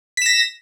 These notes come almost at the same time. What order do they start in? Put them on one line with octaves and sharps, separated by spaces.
B6 E7 A#6